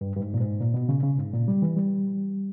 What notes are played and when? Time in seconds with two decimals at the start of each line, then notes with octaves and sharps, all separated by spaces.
0.01 G2
0.16 G2
0.20 G#2
0.34 A#2
0.40 G#2
0.60 A#2
0.74 B2
0.89 C#3
1.03 C#3
1.18 G#2
1.34 A#2
1.48 G3
1.62 E3
1.77 G3